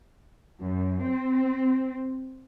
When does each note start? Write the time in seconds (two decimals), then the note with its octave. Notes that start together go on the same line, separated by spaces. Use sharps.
0.59 F#2
1.03 C4